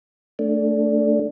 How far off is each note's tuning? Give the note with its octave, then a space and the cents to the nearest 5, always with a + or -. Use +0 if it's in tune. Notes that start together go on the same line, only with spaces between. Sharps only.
A3 +10 D4 -10